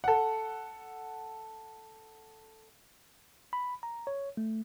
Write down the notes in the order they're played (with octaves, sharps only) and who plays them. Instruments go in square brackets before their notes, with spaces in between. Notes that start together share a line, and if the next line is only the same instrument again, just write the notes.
[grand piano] A4 F#5
[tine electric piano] B5
A#5
C#5
A3